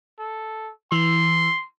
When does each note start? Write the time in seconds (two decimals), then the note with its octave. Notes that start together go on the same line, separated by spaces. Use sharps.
0.19 A4
0.92 E3 C6